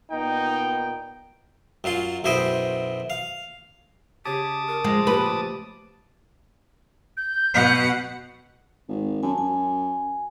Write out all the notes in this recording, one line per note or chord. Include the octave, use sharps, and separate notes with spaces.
A#2 B3 D#4 G5
F#2 F#3 F4 C6
B1 F#2 E4 C5 D#5 G5
F5
C#3 G4 G#4 A5 D6 D#6
A#4 C#6
F3 G#3 D#5
A#2 A3 G4 B4 C#6
A4
G6
B2 F#5
G#1
F#2 G#5 A5
F#2 G#5